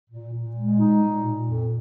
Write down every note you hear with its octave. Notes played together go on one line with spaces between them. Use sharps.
A#2
A#2
G#3
D#4
A#2
A#2
F2